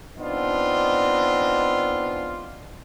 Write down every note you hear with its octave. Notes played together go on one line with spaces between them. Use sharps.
B3 C4 D4 D#4 F4